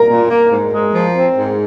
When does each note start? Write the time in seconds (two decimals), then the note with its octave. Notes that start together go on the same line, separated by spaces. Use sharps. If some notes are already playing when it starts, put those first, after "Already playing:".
Already playing: A#4 A#5
0.08 A#2
0.30 A#3
0.51 G#2
0.73 G#3
0.94 F3
1.16 C4
1.38 G#2